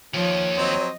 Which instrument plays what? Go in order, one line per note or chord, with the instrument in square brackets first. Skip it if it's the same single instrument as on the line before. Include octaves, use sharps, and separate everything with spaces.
[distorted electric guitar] D#2 D#3 [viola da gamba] F3 [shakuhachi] C#5
[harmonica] F#3 C4 [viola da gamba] D#5